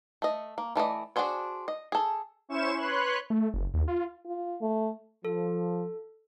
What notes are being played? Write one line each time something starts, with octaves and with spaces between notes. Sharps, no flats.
A3 D#5
A#3
E3 A3 D5 D#5
D4 F#4 G#4 C5 C#5
D#5
G#4 A4
C#4 E4 C5 C#6 E7
B4 C#5 C6 F#6
A3
F#1
D#2
F4
F4
A3
F3 A4